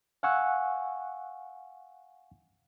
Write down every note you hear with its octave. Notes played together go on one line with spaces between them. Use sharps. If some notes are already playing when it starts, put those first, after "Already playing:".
F5 F#5 G#5 C#6 E6 F#6